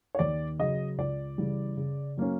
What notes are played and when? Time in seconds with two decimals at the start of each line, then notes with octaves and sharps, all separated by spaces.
0.15 C#5
0.19 D#2 D5
0.59 C#3 F#3 D#5
0.98 C#2 D5
1.38 C#3 E3 G3
1.77 C#3
2.17 F#3 A#3 C#4